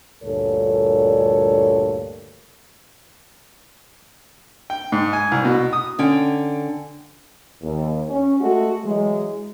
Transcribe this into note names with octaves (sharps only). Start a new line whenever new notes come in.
D2 G2 A#2 A4 A#4 C#5
G5
G#2
G#5
C2
B2
D#6
D3 C#4 G5
D#2
C#4
G#3 A3 F#4
E3 F#3 G#3